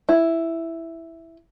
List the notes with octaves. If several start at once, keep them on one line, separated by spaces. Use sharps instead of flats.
E4